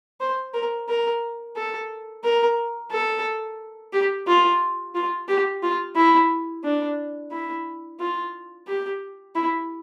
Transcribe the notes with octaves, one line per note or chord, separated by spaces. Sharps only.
C5
A#4
A#4
A4
A#4
A4
G4
F4
F4
G4
F4
E4
D4
E4
F4
G4
E4